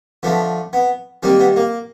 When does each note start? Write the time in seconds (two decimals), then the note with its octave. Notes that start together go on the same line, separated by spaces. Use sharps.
0.23 D3 F3 A3 B3
0.73 B3
1.23 D#3 G3 A#3 C4
1.40 B3
1.56 A#3